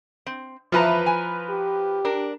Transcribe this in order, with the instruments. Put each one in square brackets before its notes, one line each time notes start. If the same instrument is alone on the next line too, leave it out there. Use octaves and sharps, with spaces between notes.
[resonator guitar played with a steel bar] C4
[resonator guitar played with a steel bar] E2 E3 A5 [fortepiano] F3 B4 A#5
[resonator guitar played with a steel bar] G#5
[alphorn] G4
[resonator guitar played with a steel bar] D4 A#4